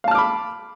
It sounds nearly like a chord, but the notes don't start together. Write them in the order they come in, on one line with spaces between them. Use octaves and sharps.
F5 A5 F6 D6 B5